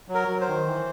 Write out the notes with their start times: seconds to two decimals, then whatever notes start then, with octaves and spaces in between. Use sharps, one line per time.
0.09 F#3
0.15 A#4
0.28 F#3
0.41 C5
0.47 D#3
0.66 E3